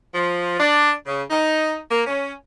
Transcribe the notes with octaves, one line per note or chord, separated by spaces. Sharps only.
F3
D4
C#3
D#4
A#3
C#4